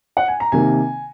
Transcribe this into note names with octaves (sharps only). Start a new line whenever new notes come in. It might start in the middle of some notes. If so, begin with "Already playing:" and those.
F#5
G#5
A#5
C3 D#3 A#3 G#5